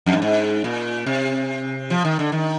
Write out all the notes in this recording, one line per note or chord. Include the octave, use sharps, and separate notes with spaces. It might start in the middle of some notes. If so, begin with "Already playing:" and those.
F2
G2
G#2
A#2
C3
F3
D#3
D3
D#3